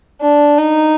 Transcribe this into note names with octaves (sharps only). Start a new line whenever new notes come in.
D4
D#4